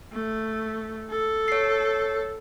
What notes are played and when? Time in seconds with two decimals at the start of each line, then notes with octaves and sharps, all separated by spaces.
0.13 A3
1.11 A4
1.48 C#5 C7